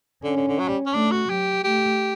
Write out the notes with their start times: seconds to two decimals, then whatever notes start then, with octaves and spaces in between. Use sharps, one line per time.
0.24 D3 C#4
0.37 D3
0.48 D3
0.59 F#3
0.68 G3
0.86 C#4
0.94 A3 D4
1.11 F#4
1.29 F#3 G4
1.64 A3 G4